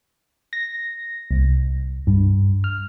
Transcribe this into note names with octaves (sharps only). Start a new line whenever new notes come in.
A#6
C2
G2
F6